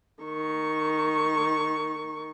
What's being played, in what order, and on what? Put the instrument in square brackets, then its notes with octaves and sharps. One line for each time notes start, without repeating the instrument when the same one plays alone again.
[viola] D#3 C#6